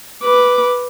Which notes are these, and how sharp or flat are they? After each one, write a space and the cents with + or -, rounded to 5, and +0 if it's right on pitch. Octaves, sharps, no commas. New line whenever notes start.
B4 +0 D6 +0